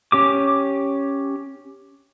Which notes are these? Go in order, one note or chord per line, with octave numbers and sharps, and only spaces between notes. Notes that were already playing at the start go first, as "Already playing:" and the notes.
C#4 G4 D6